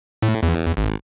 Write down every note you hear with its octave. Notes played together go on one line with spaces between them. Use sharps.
A2
E2
G#1